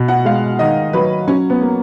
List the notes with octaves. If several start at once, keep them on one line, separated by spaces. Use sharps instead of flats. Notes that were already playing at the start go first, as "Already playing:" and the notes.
Already playing: B2
F#5
G#3 F5
D#3 D#5
F#3 B4
F#3 C#4
B3
A#3